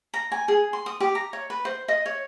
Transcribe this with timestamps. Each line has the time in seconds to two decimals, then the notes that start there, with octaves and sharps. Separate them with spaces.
0.14 A#5
0.32 G#5
0.48 G#4
0.73 C6
0.86 D#6
1.00 G4
1.15 A#5
1.33 C#5
1.50 B4
1.65 C5
1.88 D#5
2.06 C#5